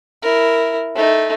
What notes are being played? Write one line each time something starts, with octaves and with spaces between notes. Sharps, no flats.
E4 A#4
A3 D#4